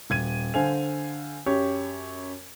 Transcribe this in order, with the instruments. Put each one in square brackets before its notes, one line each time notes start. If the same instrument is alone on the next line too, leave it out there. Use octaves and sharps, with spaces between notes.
[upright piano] D#1 G#6 D#7
D3 C5 F5 G#5 F7
F#2 G4 C#5